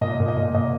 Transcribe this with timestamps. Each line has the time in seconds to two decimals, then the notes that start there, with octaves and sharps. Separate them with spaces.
0.01 A#2 D#5
0.20 A#2
0.28 D#5
0.37 A#2
0.55 A#2 D#5